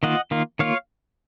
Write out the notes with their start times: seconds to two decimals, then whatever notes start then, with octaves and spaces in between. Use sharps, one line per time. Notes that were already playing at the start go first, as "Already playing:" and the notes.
0.03 D#3 A#3 F4 D#5 F#5
0.31 D#3 A#3 F4
0.59 D#3 A#3 F4 C#5 F5